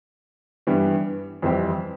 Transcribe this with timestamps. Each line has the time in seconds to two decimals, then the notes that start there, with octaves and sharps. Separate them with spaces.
0.67 G2 E3 G3 B3
1.42 F2 E3 G3 C4 G4